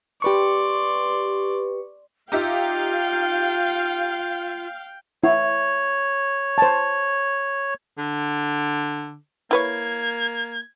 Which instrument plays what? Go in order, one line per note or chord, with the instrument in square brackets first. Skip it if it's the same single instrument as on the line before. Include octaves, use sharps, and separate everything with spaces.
[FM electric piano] G4 B4 C#6 [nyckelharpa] D5 C6
[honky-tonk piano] D#4 G4 E5 [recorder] F4 [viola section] F5 [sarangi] G5
[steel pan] E4 [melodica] C#5
[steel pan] C5 A5
[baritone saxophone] D3
[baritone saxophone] A#3 [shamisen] E4 B4 C#5 [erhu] G#6